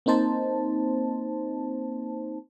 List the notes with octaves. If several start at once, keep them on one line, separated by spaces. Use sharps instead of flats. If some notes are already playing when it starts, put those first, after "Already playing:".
A#3 C4 D#4 C5 A5